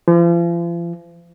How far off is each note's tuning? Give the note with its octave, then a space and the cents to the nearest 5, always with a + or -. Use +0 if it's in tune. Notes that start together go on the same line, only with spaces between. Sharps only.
F3 -40